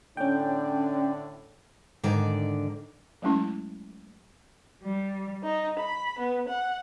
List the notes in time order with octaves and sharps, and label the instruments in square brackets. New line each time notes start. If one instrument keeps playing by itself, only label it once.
[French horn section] A2 D3 D5 [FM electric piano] C#4 G5
[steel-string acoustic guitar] G#2 D3 D#3 D5
[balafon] F#3 G#3 A3 C#4 E4
[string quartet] G3
D#4
B5
B3
F#5